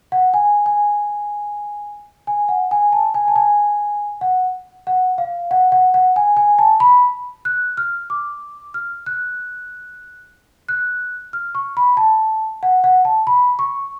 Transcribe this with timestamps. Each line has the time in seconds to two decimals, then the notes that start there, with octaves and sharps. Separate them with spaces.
0.12 F#5
0.34 G#5
0.66 G#5
2.27 G#5
2.49 F#5
2.71 G#5
2.93 A5
3.14 G#5
3.28 A5
3.36 G#5
4.21 F#5
4.87 F#5
5.18 F5
5.51 F#5
5.72 F#5
5.94 F#5
6.16 G#5
6.37 G#5
6.59 A5
6.80 B5
7.45 F#6
7.77 F6
8.10 D6
8.74 F6
9.06 F#6
10.69 F#6
11.33 F6
11.55 C#6
11.77 B5
11.97 A5
12.63 F#5
12.84 F#5
13.05 A5
13.27 B5
13.59 C#6